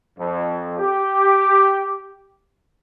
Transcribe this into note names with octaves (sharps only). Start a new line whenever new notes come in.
F2
G4